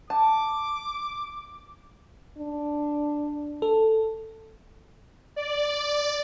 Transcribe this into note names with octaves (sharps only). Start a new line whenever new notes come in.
A5 D6
D4
A4
D5